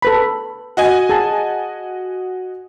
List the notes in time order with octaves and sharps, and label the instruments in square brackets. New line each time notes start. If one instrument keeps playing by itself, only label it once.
[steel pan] A4 B4 B5
[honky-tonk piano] F#4 D#5 G#5
[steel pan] G#4 A5